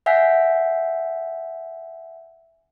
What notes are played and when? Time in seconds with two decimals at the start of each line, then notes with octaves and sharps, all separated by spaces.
0.06 E5 F#5 G#5 E6 G6 B6